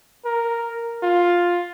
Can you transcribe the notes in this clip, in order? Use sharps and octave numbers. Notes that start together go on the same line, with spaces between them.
A#4
F4